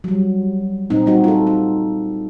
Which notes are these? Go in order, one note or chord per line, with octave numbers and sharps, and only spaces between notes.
F#3 G3
A#2 C4 D#4
G3 D#4 F#4
F4 A4
D#4